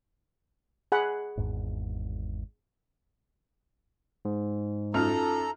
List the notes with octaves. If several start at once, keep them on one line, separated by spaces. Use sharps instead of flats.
G#4 F#5 B5
G#1 E2 G#2
G#2
F#2 D#4 F4 A4 A#5 F6